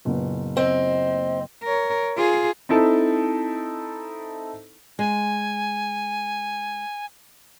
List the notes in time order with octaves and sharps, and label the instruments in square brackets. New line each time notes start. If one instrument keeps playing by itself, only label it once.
[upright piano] F#1 A#2 B3
[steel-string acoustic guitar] C4 [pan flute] D#5
[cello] A#4 C#5
F4 G#4
[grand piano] C4 D#4 E4 A4
[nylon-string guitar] G#3 [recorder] G#5